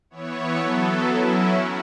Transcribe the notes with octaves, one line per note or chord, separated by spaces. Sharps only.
E3 B3 E4 C#5
F#3 B3 A4
F#3 C#4 E4
F#4